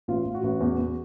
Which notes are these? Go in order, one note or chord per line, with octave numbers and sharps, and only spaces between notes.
A1 F4
A1
F#4
A1
E2
E2